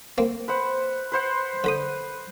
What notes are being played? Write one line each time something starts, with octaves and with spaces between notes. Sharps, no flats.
A#3 C4
B4 C5 F#5
B4 C5 F#5
D3 B5 D#6